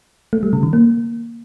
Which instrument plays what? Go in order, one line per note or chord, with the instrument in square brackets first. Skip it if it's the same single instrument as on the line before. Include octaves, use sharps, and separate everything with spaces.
[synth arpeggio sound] A3
G3
C#3
D#3
A#3